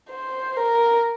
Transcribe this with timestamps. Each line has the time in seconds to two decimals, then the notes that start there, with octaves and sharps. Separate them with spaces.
0.10 C5
0.56 A#4